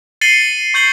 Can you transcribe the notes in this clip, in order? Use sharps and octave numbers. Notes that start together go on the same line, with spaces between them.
A6 C7 C#7 D#7 F#7 G7
C#6 G6 C7 F#7 G7